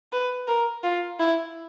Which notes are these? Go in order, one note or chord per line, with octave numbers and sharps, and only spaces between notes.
B4
A#4
F4
E4